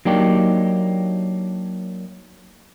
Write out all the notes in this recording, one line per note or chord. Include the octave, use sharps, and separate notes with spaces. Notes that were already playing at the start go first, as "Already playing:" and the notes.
F#3 A#3 D4 D#4 G4